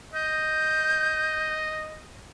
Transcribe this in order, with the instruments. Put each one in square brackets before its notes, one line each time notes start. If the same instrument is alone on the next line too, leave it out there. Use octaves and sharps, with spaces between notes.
[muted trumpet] D#5 [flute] G6